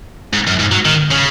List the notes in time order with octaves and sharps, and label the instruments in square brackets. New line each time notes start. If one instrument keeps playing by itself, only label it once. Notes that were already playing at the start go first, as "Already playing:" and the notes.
[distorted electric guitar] G#2
F#2
G#2
F#3
D#3
C#3